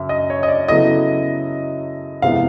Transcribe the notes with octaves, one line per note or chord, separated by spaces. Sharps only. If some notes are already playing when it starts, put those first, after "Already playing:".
Already playing: F#2 C#3 E5
D#5
C#5
D#5
D5
C#3 F#3 B3 E4 A4 D#5
F2 C3 E3 G#3 B3 F5